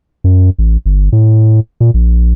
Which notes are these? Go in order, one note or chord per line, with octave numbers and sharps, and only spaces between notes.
F#2
A1
G1
A2
A#2
A#1